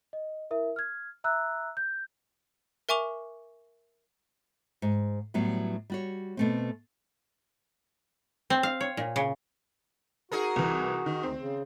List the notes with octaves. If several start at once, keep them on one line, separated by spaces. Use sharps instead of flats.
D#5
E4 A#4 E5
F6 G#6
E5 A#5 E6 F#6
G6
A#4 E5 G#5 C#6 D6 F7
G#2
A2 F#3 G3 B3
G3 F#4 C#5
B2 A3 C4
C4
F5
C#5
A#2
C#3
D#4 F#4 G#4 A#4
C2 E3
D#3
D2 C4
C#3